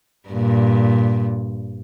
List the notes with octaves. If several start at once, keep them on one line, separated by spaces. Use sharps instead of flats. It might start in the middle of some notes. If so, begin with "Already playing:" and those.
G2 A#2